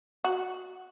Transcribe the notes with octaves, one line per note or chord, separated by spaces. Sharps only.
F#4